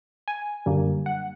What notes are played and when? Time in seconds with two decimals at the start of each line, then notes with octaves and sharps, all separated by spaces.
0.28 G#5
0.66 F#2 D3 G3 A#3
1.06 F#5